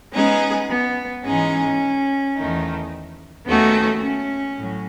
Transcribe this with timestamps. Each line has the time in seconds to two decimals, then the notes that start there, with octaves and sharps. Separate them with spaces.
0.13 G#3 B3 C#4 D#4 G#4
0.70 B3
1.24 G#2 E3 G#3 C#4 D#4 G#4
2.35 E2 D#3 A3 D#4
3.46 D#2 D#3 A3 B3 C#4 F#4
4.02 C#4
4.57 A2 F#3